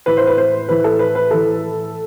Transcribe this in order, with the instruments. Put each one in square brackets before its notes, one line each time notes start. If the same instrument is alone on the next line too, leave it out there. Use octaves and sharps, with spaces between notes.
[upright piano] A2 E3 B4
C5
B4
C5
A2 E3 B4
A4
B4
B4
A2 E3 A4